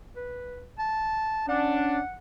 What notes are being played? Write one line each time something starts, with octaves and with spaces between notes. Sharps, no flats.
B4
A5
C#4 D4 F#5